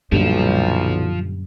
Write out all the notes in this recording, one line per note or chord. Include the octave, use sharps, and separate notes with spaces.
B1 F#2 A#2 D3 F3 G3